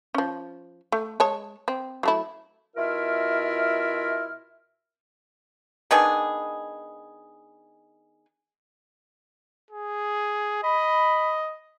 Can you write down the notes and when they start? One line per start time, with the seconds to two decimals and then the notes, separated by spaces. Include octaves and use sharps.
0.14 F3 C#4
0.92 A3
1.20 G#3 C#5 A5
1.68 C4
2.03 F#3 A3 E4
2.76 B2 E4 F4 A#4 E5 F6
5.91 D#3 B3 D4 G#4
9.71 G#4
10.63 D#5 B5